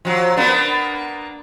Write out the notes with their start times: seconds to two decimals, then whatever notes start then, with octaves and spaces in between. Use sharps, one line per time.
0.05 F3 F#3
0.37 A#3 B3 D4